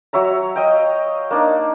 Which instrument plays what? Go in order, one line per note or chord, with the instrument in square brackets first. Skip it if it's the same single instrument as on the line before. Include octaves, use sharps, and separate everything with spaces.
[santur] F#3 C#5 E5 A#5
D#5 F5 G5
A#3 D4 D#4